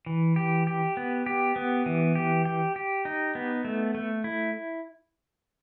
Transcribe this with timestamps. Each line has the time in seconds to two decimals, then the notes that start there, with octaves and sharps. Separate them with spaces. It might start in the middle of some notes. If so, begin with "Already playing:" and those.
0.06 E3
0.36 G4
0.67 G4
0.97 B3
1.26 G4
1.56 B3
1.86 E3
2.15 G4
2.45 G4
2.76 G4
3.05 D#4
3.35 B3
3.65 A3
3.95 A3
4.24 E4